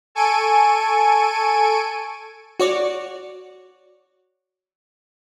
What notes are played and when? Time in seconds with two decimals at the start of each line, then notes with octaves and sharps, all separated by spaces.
0.15 A4 G#5 C#6 D7 D#7
2.60 F#4 C#5 D5